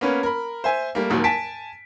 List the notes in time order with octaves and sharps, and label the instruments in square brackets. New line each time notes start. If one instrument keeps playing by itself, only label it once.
[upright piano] A#3 B3 C#4 B4
A#4 B5
C5 E5 G#5
G3 A3 A#3
D#1 D#2 G#2 F#3
G#5 A5 B6 D7